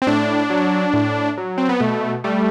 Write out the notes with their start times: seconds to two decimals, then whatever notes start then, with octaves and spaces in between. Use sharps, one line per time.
0.02 C4
0.07 A2 D4
0.50 F#3
0.93 A2
1.38 F#3
1.58 C4
1.69 B3
1.80 B2 A3
2.24 G3 A3